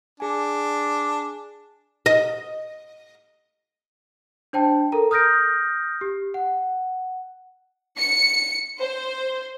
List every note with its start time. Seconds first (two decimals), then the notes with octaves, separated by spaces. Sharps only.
0.20 D4 G#4 G#5
2.06 D#5
4.53 D4 C5 G5 A5
4.92 A4 A#4 A#5
5.11 D#6 F6 G6 A#6 D7
6.01 G4
6.34 F#5
7.97 C#7
8.79 C5